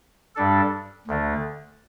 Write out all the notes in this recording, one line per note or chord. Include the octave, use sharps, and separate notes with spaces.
G2 G3 D4 A4
D2 D3 A3